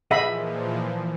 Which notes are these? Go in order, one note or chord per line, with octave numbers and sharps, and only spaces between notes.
A#2 E3 F3 G#4 D#5 E5 F#5 B5